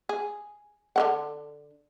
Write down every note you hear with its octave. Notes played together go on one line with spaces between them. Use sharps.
G#4
D3 D#3 F#5